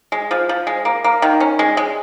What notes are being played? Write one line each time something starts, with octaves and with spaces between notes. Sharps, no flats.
G#3
F3
F3
G#3
A#3
A#3
D#3
C#4
G#3
G#3